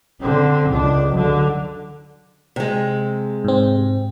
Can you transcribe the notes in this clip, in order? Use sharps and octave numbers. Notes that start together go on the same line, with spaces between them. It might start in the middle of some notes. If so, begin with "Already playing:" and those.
D3 C4
C#2 D4
D3 F#3
C3 G#3
G#2 C4